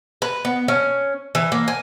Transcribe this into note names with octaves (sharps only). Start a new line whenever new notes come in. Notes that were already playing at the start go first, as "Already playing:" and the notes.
B4
B3
C#4
E3
A#3
G#5